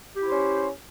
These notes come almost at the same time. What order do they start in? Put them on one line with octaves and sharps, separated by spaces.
G4 E4 C5 C#4